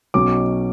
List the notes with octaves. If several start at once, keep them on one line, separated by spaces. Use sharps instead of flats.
B1 B2 F#3 C#4 D6